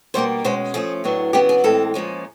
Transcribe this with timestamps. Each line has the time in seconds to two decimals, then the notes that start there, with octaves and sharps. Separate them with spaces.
0.14 B2 G3 A#3 D4 C5
0.44 B2 G#3 C#4 C5
0.74 F3 A3 C#4 G#4
1.04 A2 F#3 B3 D4
1.33 C#3 F#3 B3 D4 G4
1.49 G#4
1.64 A2 E3 G#3 C4 A4
1.94 A#2 F3 G#3 C#4